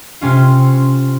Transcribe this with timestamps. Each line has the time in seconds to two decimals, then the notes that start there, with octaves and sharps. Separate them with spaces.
0.21 C3 C#4 F4